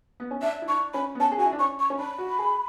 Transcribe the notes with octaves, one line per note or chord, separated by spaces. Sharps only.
B3
C#4
D4 E5
E4
D4 C#6
C#4 B5
B3
C#4 A5
G#4
F#4 G#5
E4
D4
C#4 C#6
C#6
C#4
D4 B5
F#4
G#4